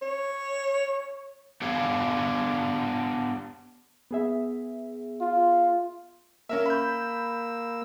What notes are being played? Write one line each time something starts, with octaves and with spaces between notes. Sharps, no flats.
C#5
B3 D4 G4 C#5 F5
B3 G#4 E5
F4
A#3 C#4 A#4 E5 E6
B5 G6